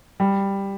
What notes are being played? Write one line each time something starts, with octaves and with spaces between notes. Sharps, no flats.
G3